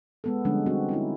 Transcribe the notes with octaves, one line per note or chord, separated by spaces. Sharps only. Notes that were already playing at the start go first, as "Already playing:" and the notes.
G#3 B3 A4
D3 F3 G3 G#3 C#4 D4
G3 C4 F#4
C#4 D#4 E4